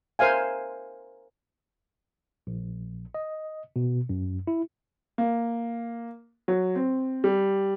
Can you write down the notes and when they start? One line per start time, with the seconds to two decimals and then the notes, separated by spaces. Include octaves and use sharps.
0.19 A#4 C5 E5 F5 G#5
2.47 A#1
3.15 D#5
3.76 B2
4.09 F#2
4.47 E4
5.18 A#3
6.48 F#3
6.75 C4
7.24 G3